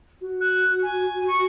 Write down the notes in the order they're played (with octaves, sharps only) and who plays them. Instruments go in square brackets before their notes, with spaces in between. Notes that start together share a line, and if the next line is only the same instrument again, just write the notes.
[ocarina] F#4
[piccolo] F#6
G#5
C#6